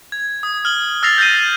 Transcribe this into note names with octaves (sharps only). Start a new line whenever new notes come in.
G#6
D#6
F6 F#7 G7
E6 F6 A6 A#6 C7 F7
G6 A6 A#6 C7 D#7
D#7